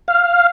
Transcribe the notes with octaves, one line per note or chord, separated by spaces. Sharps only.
F5